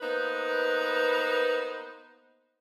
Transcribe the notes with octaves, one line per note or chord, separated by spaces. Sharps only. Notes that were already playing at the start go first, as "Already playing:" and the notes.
A#3 B3 D#4 B4 C5